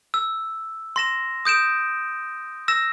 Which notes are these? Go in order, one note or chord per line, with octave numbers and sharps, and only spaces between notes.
E6
C6 A#6 E7
D#6 G6 D7 E7
E6 A#6 E7